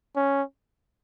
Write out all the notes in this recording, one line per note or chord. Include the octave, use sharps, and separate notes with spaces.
C#4